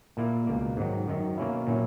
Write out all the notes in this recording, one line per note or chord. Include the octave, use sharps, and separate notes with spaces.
A#2 A#3 E4
C#2 B2 A#3
G#2 D#3 F#3
F#2 D#3 F#3
B2 A#3 C#4 E4
A#2 F#3 C#4 E4